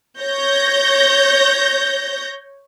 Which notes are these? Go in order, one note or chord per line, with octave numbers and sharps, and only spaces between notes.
C#5 G6 A#6